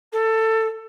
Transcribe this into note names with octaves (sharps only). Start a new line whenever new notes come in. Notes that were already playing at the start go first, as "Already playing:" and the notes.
A4